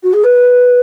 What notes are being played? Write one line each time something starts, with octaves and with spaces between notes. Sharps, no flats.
F#4
G#4
B4